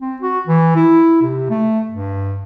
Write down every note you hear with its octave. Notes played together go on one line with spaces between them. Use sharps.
C4
F#4
E3
E4
C3
A3
G2